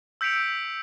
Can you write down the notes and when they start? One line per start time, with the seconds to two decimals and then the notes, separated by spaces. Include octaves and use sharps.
0.21 E6 G6 B6 C#7 D7 F7